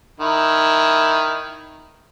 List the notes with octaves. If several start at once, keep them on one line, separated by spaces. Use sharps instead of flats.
D#3 E4